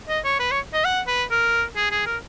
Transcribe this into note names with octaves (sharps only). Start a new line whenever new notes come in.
D#5
C#5
B4
C#5
D#5
F#5
B4
A#4
G#4
G#4
A#4